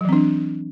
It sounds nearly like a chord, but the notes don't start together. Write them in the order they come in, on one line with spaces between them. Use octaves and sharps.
F#3 E3 C4 D4